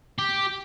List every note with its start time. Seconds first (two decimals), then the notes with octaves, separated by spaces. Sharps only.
0.19 G4